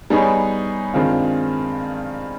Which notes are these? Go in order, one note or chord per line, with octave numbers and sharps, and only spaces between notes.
G3 B3 D#4 G#4 C#5
G2 D#3 G#3 C4 F4